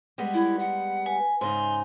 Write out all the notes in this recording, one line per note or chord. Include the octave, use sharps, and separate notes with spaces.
G3 G#3 B3
E4
F#5
B4 G#5
G#2 C#3 D#4 G#5 C6